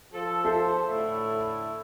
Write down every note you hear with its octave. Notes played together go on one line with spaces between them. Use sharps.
F3 A4
A4 C5 E5
A2 D3 A3 E4